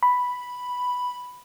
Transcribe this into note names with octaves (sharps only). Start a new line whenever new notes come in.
B5